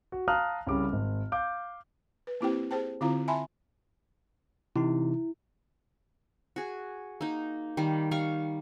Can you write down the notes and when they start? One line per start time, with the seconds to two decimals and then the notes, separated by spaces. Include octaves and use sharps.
0.12 F#4
0.28 F5 A5 A#5 D#6 F6 F#6
0.67 C2 C#3 G3 D6
0.92 G#1
1.32 F5 D6 G6
2.27 B4
2.41 A#3 C4 E4 G4 C5 G5
2.71 G#4 C5 G5 A5
3.01 D3 C4 E4 F4 F5 A#5
3.28 E5 G#5 A5 B5 C6
4.76 C3 E3 D#4 E4
6.56 F#4 G#4
7.21 A#3 D#4
7.77 D#3 G3
8.11 G3 F5 C#6